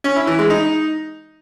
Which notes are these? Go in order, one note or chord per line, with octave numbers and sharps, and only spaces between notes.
C#4
E4
E3
G#3
D#4